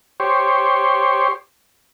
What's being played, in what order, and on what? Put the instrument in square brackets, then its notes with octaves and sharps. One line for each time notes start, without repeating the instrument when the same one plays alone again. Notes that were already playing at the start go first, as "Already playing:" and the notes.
[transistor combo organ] G4 C5 C#5